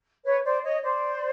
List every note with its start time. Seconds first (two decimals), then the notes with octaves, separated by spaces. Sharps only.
0.24 B4 C#5
0.44 C5 D5
0.63 C#5 D#5
0.82 C5 D5